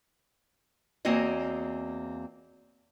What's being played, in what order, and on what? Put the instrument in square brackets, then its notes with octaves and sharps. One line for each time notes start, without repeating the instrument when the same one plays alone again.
[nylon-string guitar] E2 A#3 C4 C#4 F#4 D#5